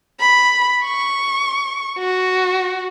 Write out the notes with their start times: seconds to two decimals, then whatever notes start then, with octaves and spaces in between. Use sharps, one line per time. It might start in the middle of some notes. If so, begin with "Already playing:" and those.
0.20 B5
0.84 C#6
1.98 F#4